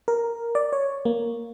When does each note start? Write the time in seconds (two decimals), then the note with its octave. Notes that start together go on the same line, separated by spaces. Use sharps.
0.08 A#4
0.55 D5
0.73 C#5
1.05 A#3